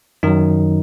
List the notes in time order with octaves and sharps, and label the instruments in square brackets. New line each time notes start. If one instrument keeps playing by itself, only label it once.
[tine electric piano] F#2 D#3 F#3 D#4